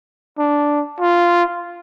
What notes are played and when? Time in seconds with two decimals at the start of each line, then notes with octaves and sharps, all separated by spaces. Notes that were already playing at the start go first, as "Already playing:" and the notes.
0.38 D4
1.00 F4